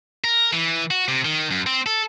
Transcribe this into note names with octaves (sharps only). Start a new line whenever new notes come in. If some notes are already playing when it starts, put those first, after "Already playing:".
A#4
E3
F#4
C3
D#3
F#2
C4
A4